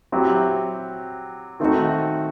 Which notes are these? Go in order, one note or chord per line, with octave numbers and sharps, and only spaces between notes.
F#3 C4 E4 G4
D#3 A3 C4 D#4 F#4